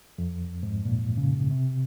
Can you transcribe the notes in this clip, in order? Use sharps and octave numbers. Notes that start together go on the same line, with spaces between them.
F2
G#2
A#2
C#3
C3